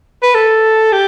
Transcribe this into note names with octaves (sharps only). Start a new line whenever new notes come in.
B4
A4
G4